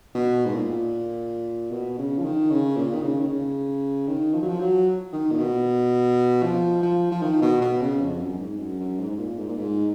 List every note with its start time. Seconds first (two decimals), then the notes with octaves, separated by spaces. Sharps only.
0.15 B2
0.45 G#2
0.54 A#2
1.72 B2
1.98 C#3
2.18 F3
2.24 D#3
2.50 C#3
2.77 A#2
2.95 D#3
3.03 C#3
3.20 D#3
3.29 C#3
4.08 D#3
4.34 F3
4.42 F#3
4.49 F3
4.60 F#3
5.12 D#3
5.31 A#2
5.39 B2
6.43 F3
6.83 F3
7.11 F3
7.22 D#3
7.42 B2
7.61 B2
7.81 C#3
8.00 F2
8.20 F#2
8.33 F#2
8.40 G#2
8.59 F#2
8.79 F#2
8.99 G#2
9.10 G#2
9.18 A#2
9.38 G#2
9.48 A#2
9.58 G#2